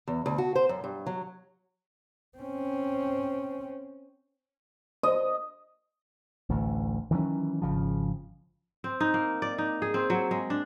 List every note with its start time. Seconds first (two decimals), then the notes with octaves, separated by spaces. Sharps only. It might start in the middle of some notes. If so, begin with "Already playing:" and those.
0.08 E2
0.26 D2
0.38 F#4
0.55 C5
0.69 F#2
0.84 G2
1.06 F#3
2.38 C4 C#4
5.03 D#5
6.49 A1 D2
7.11 D#3 E3 F#3 C#4
7.62 G#1 C#2 C#3 F3
8.84 C4
9.00 D#4
9.14 A#3
9.42 D5
9.58 D#4
9.82 G#4
9.94 C4
10.10 F#3
10.31 G#3
10.50 D4